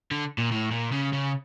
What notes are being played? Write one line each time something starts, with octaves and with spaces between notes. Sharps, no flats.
D3
A#2
A2
A#2
C#3
C#3